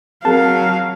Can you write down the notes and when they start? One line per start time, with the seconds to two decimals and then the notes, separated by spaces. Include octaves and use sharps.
0.25 F#3 C4 G#4 A#4 F5 A5